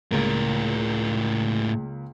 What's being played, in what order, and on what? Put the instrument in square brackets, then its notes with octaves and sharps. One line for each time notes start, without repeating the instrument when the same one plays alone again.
[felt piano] C#2 A#3 [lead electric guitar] A2 A#4